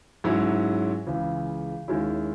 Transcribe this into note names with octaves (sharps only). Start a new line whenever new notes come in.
G#2 F#3 C#4 E4
C#2 C#3 E3
D#2 D#3 G#3 C#4 E4